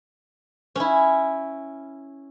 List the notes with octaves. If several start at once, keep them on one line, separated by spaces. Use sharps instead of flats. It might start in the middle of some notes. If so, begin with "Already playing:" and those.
C#4 E4